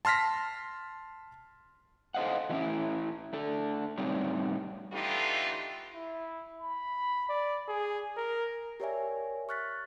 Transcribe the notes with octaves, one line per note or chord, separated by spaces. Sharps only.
A5 C6 F6 A#6 B6
A4 C5 D#5 F5 F#5
E3 G3 A3 B3 C#4 E4
A3 D4 A4
A2 G3 C4 D#4 C#5 D5
D3 E3 A3 D#4 F4 G4
E4
B5
D5
G#4
A#4
G4 A#4 C#5 D5 E5 G#5
C#6 F6 F#6 A6 B6